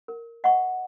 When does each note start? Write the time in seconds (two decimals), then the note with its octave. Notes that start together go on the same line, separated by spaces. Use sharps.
0.08 A#4
0.44 D#5 F#5 C#6